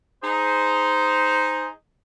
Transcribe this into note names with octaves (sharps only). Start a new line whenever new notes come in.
D#4 G#4 C5